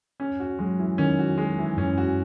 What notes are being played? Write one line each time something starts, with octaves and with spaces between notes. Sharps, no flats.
C#4
F#4
F#3 G#3
E3
D#3 C#4
F#4
G#3
E3
F#2 C#4
F#4